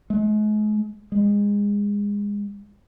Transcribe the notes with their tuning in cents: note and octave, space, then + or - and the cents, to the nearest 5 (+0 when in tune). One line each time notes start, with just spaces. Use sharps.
G#3 +40
G#3 -25